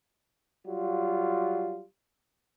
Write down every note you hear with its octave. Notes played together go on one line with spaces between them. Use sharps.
F#3 G3 F4